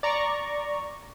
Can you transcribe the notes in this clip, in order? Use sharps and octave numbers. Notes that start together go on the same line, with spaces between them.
D5 A#5 C#6